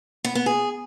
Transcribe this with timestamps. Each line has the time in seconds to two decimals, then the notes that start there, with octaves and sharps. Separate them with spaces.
0.24 B3
0.35 B3
0.46 G#4